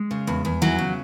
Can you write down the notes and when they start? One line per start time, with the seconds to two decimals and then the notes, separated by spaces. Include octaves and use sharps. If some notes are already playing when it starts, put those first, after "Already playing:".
Already playing: G#3
0.11 C#3
0.27 E2
0.45 E2
0.62 E3 F#3
0.79 C#3